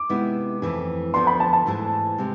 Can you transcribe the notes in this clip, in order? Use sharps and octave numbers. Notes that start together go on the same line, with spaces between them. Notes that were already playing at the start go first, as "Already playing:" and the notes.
Already playing: D6
C3 G#3 B3 E4
F2 E3 A3 E4 G#4
D2 D3 F3 B3 D4 C6
B5
A5
A5
G#2 E3 A3 E4 G#4
C3 G#3